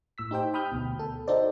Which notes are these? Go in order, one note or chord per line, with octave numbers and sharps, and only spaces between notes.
A2 E6 B6
D#4 G4 C5 G5
G5 B5 D#6 F6 G6
D2 B2
A4
D#4 F#4 A4 C5 D5